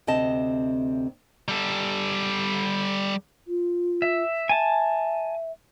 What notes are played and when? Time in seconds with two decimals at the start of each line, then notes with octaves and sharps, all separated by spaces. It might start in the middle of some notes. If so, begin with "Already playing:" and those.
0.07 D2 C3 C4 D#5 A5
1.49 G3 A4
3.48 F4
4.02 E5
4.49 E5 G#5 A5